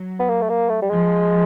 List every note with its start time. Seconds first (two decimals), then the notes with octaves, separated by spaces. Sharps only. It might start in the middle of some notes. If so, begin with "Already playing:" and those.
Already playing: F#3
0.19 B3
0.29 A#3
0.42 A3
0.49 A#3
0.69 A3
0.82 G3
0.89 F3 G#3